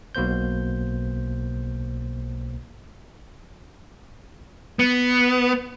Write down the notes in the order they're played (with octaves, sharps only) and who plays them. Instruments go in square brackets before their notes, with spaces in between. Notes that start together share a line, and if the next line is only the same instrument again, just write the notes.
[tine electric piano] B1 B2 A#3 C5 G6
[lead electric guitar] B3